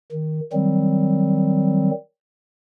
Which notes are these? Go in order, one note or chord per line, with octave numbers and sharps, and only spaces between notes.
D#3
D#3 F#3 G3 C4